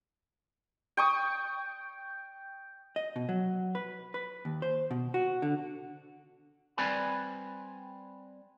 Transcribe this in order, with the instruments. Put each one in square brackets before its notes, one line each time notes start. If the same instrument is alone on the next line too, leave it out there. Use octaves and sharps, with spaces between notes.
[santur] G5 C#6 D#6
[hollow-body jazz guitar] D#5
B2
F#3
B4
B4
D#2
C5
B2
F#4
D3
[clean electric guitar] G3 C4 B4 D5 G#5 B5